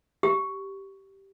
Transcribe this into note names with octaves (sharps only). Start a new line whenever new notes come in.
G4